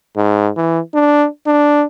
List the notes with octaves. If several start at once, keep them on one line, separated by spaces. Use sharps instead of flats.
G#2
E3
D4
D4